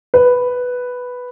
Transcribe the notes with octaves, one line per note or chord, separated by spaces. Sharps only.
B4